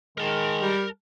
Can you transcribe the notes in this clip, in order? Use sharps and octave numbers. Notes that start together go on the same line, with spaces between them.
D#3 G#3 A#4 A5
G3